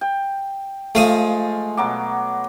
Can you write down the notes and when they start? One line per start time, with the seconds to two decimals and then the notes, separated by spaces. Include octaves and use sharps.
0.01 G5
0.95 F3 G#3 A3 F5 D#6
1.77 B2 F#3 D6